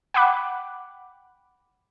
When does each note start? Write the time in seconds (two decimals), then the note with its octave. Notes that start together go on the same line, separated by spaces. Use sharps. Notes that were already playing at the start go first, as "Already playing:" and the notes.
0.14 F#5 G5 B5 D6 F#6